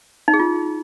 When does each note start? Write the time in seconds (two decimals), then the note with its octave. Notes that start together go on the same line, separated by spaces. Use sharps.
0.28 D#4
0.34 G#4
0.39 F4